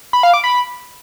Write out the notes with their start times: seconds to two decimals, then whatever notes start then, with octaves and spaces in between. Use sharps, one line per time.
0.13 B5
0.23 F5
0.34 D6
0.44 B5